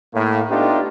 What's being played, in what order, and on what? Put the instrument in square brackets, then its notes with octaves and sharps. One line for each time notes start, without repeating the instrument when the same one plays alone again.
[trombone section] A2 A#3
A3 B3 D4 D#4 F4 G4